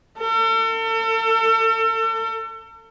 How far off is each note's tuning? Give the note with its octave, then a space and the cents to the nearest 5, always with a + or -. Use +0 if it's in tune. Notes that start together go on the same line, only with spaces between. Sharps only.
A4 +40